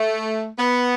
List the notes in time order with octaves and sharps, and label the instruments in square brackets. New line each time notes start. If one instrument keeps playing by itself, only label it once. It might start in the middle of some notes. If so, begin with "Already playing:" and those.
Already playing: [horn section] A3
B3